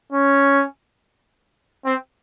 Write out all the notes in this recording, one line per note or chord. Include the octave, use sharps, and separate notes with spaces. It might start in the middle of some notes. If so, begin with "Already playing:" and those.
C#4
C4